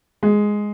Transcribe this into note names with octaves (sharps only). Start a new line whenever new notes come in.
G#3